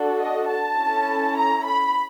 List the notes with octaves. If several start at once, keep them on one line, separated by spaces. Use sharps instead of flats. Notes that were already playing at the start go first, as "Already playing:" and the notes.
Already playing: D4 F#4 A4
D#5
A5
C#4 E4 A4
A#5
B5